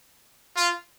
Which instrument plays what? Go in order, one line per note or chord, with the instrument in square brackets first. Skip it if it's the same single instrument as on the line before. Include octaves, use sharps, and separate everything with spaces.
[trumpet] F4